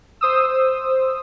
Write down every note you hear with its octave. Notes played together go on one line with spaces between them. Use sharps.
C5 D#6 E6